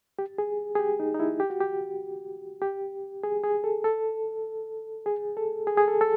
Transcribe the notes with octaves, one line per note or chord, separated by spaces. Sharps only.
G4
G#4
G#4
G4
D#4
D#4
E4
G4
F#4
G4
G4
G#4
G#4
A4
A4
G#4
A4
G#4
G#4
A4
A4